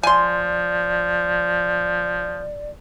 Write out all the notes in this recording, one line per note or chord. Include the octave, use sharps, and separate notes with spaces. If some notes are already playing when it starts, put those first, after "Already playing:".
F3 D5 G#5 C6